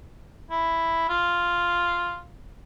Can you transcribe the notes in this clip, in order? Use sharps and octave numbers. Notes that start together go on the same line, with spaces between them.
E4
F4